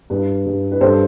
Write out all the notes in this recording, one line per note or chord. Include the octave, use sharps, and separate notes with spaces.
G2 B4
G2
B4
G2 A4 C5